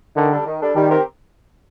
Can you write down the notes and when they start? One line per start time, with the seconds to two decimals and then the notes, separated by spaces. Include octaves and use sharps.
0.16 D3 D#3
0.31 G3 D4 A4
0.46 D#3
0.61 G3 D4 A4
0.75 D#3 G3
0.90 C4 G4 A#4